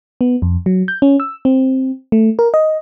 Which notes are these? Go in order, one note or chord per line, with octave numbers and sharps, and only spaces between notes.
B3
F2
F#3
G6
C#4
E6
C4
A3
A#4
D#5